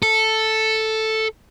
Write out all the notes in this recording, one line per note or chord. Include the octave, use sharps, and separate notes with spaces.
A4